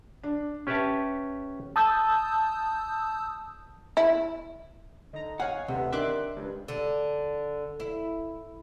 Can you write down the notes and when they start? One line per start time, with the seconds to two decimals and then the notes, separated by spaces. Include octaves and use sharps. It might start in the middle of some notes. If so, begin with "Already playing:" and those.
0.23 D4
0.67 C#4 G4 B4 C#5 E5 A5
1.76 A5 D#6 E6 G6
3.97 E4
5.13 D3 D#4 A#5
5.40 C#5 F5 F#5 G#5
5.68 A1 D2 C3 B3
5.92 D#3 D4 E5 C6 D6 F#6
6.37 C#2 G2
6.68 D3
7.80 E4